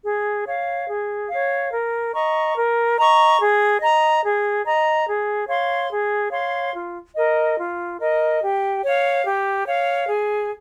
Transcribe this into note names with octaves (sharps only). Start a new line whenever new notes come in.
G#4
C#5 F5
G#4
C#5 F5
A#4
D#5 A#5 C#6
A#4
D#5 A#5 C#6
G#4
D#5 A#5
G#4
D#5 A#5
G#4
C#5 F5 C6
G#4
C#5 F5 C6
F4
A#4 D#5
F4
A#4 D#5
G4
C#5 F5
G4
C#5 F5
G#4